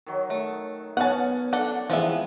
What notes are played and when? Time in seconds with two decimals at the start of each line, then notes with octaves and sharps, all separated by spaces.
0.06 D#3 F#3
0.30 A3
0.97 B3 C#4 F#5 G#5 A5
1.53 D4 A4 F#5
1.90 C3 E3 F3 G#3 B3 E5